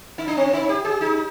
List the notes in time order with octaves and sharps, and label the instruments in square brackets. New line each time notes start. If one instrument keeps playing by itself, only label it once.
[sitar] D#4
D4
C4
D#4
G4
G#4
D#4